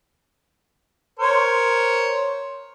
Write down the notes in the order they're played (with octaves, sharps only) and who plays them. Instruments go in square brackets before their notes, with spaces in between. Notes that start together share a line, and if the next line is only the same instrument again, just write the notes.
[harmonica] A#4 C5 C#5